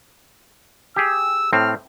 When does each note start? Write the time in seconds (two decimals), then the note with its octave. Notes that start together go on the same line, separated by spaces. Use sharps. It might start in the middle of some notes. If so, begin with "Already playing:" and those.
0.96 G4 G#4 E6
1.53 A2 C4 F6